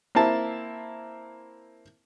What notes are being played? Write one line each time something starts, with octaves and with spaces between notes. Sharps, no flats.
A#3 C4 E4 A5